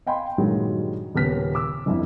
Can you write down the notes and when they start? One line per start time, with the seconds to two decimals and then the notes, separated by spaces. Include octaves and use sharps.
0.06 D#5 F5 G5 G#5 B5 C6
0.38 G2 A#2 D#3 F#3 G#3
1.15 D#1 C#3 B3 F6 B6
1.55 D6 E6
1.86 G1 F2 E4